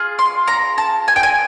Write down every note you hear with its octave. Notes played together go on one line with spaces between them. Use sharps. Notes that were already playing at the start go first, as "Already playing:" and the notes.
Already playing: F4 G#4
C6
A#5
A5
G#5
G5
G#5